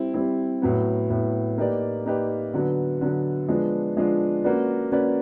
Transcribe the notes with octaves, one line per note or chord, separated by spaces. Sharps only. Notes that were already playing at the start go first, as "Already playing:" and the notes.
Already playing: G3 C4 E4
G3 C4 E4
A2 F#3 B3
A2 F#3 B3
A#3 D#4 G4 B4 D5
A#3 D#4 G4 B4 D5
D3 F#3 B3
D3 F#3 B3
F3 G#3 B3 D4 F4
F3 G#3 B3 D4 F4
A#3 C#4 F#4 B4 D5
A#3 C#4 F#4 B4 D5